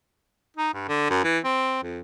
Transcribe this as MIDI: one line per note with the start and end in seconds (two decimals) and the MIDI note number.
0.57 0.70 63
0.74 0.87 43
0.88 1.08 50
1.10 1.20 42
1.24 1.39 52
1.44 1.81 60
1.83 2.00 41